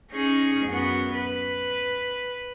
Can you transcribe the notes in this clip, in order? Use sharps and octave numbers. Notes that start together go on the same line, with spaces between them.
C#4 D#4 G#4
F#2 B3 F#4
B4